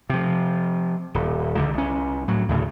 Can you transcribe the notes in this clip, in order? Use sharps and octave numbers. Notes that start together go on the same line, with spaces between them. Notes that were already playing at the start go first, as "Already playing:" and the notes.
C3 F3
D#1
C#2 D3
C2 C#4
A2 F#3
D2 A2 C#3